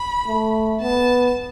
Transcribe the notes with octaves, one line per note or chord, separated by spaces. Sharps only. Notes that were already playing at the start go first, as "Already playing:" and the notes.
Already playing: B5
A3
B3 A5